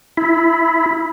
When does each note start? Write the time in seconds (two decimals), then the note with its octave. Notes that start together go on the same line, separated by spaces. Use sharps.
0.17 E4